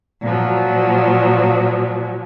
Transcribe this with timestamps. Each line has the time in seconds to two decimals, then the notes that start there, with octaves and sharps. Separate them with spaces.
0.23 A#2 F3 F#3